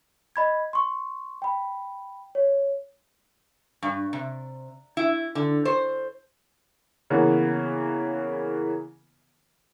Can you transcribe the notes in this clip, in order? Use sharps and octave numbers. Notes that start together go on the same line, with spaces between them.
D#5 B5 G#6
C6 C#6
G5 B5
C#5
G2
C3
E4
D3
C5
C#3 E3 A#3 B3